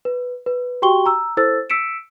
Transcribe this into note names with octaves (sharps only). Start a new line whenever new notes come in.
B4
B4
F#4 G4 G5 C6 C#6 G7
A#5 E6
E4 A4 C5 E6 A6
E6 B6 C#7 D7 E7